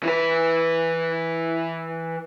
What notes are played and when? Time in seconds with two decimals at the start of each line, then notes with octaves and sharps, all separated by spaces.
0.03 E3 B4